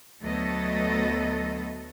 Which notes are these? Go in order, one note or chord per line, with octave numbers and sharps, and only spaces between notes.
D2 F#3 A3 B3 A4 D#5